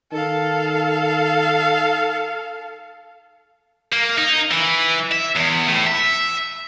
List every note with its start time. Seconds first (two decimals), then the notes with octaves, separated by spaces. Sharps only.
0.12 D#3 A4 F5
3.93 A#3
4.18 D#4
4.51 E3
5.12 E5
5.36 E2
5.67 A2
5.87 E5